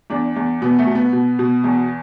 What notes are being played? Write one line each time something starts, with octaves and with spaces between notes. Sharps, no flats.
E2 D4
E2
B2 B3
A3
B2
B3
B2
B2
E2